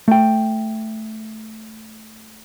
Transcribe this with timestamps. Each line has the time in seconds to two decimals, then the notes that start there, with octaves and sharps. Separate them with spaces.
0.08 A3 G5